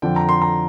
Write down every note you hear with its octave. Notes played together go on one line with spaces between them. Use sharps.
F2 D3 F3 G5
A#5
C6
A#5